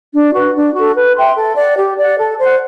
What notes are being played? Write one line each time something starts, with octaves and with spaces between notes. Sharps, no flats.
D4
F#4 B4
D4
F#4 A4
B4
E5 G5 C6
A4
D5 F#5
G4
D5 F#5
A4
C5 F#5